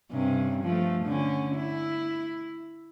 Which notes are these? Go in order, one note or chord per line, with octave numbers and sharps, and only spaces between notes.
G2 C3 C#4
F3 A3
D3 C#4
E4